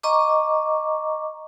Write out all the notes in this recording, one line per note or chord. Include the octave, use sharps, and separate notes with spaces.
D#5 A#5 C#6 D6